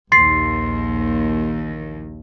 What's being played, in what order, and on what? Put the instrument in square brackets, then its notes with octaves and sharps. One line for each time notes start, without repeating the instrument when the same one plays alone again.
[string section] A#1 D#2 [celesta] C6 A6 C7